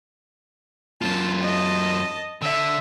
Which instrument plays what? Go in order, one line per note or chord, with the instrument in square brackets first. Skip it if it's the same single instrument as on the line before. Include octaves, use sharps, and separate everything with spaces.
[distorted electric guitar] F#2 F4 [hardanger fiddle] A5
[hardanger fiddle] D#5 A5
[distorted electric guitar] D3 [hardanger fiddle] E5